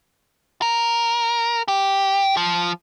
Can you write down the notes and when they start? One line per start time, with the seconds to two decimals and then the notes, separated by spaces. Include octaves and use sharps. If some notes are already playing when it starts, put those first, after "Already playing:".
0.62 A#4
1.68 G4
2.37 F3